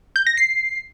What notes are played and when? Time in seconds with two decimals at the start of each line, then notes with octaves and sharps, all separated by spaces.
0.16 G6
0.27 A#6
0.37 C7